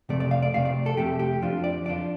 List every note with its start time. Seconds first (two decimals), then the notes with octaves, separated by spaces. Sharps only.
0.09 F2 C3 A3 D5
0.20 D5
0.31 F5
0.42 D5
0.53 F2 C3 A3 F5
0.65 D5
0.86 A4
0.97 F2 C3 A3 G4
1.19 G4
1.42 F2 F3 D4 F4
1.64 D5
1.85 F2 F3 D4 F4 D5